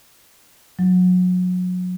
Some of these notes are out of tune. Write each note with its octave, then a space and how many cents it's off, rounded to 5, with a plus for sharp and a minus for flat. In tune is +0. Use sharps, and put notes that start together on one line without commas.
F#3 -30